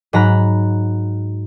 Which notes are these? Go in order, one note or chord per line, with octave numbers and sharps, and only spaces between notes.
G#2 F#3 A#5 B5 F#6